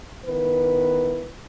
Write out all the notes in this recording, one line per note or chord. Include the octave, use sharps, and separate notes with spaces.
D#3 B3 E4 B4